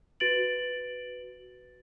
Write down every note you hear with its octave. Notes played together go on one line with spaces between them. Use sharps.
F#4 B4 A6 D7 F#7